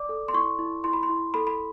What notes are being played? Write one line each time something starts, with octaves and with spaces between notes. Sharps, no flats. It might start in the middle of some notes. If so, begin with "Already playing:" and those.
Already playing: D5 D6
A4
C6
E4 C#6
E4
E4 C6
B5
C6
E4
A4 B5
B5